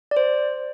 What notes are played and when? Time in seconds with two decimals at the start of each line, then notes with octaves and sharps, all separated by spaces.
0.11 D5
0.17 C5